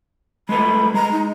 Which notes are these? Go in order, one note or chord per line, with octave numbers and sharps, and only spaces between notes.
G#3 A3 B4 B5
G#3 A#5
D#4